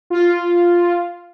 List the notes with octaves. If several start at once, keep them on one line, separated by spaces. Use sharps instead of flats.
F4